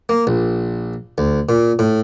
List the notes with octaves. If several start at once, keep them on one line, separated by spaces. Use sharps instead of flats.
A#3
A#1
D2
A#2
A2